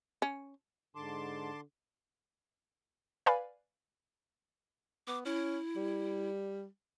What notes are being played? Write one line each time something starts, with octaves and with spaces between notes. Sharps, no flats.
C#4
G#2 D3 A5 C6 D6
B4 D5 F5 G#5 B5
B3 D6
C#4 E4
G3